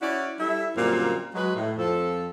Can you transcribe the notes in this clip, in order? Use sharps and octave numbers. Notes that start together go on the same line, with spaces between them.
C#4 E4 F#4 C#5 D5
G3 E4 A4 E5
F#2 A#2 D3 G3 A#3 C4
F#3 G#3 B4
A2
F2 F3 A4